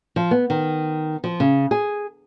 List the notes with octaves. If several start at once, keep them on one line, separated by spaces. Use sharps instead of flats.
F3
B3
D#3
F3
C#3
G#4